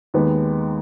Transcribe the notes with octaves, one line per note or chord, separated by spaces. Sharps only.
D#2 D#3 G#3 B3